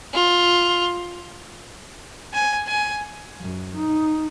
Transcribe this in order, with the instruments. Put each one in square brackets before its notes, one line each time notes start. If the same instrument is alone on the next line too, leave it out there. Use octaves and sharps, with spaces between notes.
[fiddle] F4
G#5
G#5
[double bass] F#2
D#4